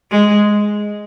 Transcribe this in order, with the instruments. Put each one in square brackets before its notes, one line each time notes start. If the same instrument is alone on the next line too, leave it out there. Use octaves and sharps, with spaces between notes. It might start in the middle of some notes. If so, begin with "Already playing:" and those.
[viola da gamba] G#3